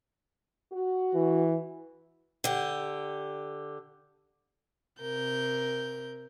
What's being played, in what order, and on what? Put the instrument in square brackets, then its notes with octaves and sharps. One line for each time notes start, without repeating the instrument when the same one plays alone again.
[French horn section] F#4
[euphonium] E3
[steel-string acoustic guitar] D3 G4
[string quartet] C3 A#4 G6